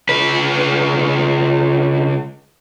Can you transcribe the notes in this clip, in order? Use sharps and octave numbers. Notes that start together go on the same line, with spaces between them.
C#2 B4